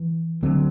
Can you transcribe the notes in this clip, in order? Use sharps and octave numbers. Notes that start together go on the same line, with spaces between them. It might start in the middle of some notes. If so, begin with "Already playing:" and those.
Already playing: E3
D3 F#3 C4